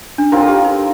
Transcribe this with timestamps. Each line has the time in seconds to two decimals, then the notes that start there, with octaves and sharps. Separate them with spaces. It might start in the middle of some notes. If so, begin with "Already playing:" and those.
0.18 D4
0.32 G3 C4 D#4 F4 A#4
0.42 A4
0.48 G4
0.65 D#4